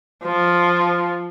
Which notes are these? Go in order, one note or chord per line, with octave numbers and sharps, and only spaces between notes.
F3